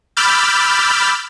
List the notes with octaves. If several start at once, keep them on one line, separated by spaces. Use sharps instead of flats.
B5 D6 E6 F6 G6 A6